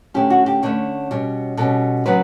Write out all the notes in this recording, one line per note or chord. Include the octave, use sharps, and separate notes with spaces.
D3 A3 C#4 G4
F#4
G4
D3 A3 C#4 C#5
B2 G3 C#4
B2 G3 C#4 A4
C#3 F#3 B3 B4